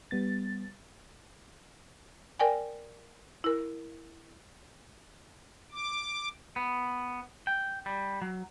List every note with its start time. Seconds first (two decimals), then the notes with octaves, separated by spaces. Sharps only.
0.11 G3 B3 A6
2.39 A#4 D5 G5 G#5
3.44 E4 A#4
5.72 D6
6.56 B3
7.47 G5
7.86 G3
8.22 F#3